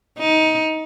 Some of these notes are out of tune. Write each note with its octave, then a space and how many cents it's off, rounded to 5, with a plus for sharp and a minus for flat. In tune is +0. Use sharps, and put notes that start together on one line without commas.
D#4 +20